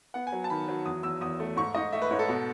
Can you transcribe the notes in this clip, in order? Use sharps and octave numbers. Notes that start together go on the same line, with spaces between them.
B3 F#5
G#5
F#3
A5
D#3 B5
F#3
E2 D#6
E2 E6
E2 D#6
A3
G#2 C#6
G#2 D#5
A3 E5
B4
G#2 C#5
A4
B2